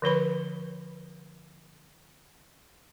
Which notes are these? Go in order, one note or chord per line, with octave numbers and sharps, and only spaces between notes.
D3 F3 B4 B5